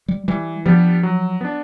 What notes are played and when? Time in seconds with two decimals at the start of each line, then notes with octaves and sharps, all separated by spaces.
0.08 G3
0.28 E3 G3
0.65 F3 G3 B3 D4 G4
1.03 F#3
1.41 B3 D4